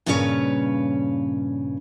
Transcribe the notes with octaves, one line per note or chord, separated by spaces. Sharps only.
G2 A#2 C#3 C#4 B4 C#5